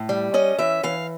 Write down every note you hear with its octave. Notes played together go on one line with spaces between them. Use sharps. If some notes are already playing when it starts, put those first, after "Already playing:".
Already playing: A2
G3
C#4 D#5
E3 E5
E3 F5